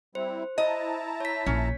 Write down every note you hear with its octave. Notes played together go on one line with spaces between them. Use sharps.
G3 C4 E4 C5
E4 D#5 A5 A#5
C#5 B6
A#1 C#4